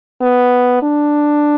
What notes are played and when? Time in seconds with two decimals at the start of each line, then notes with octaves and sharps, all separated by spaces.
0.21 B3
0.83 D4